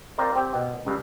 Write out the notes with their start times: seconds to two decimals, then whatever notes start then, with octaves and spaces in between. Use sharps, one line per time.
0.18 C4 F4 A#4 C5 D5
0.36 C4 G4
0.54 B2
0.85 C#2 G2